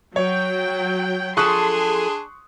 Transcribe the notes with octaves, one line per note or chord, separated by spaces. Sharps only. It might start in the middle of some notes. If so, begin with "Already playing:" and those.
F#3 C#5 G5
F3 D4 G#4 A4 C6 C#6 D#6 F#6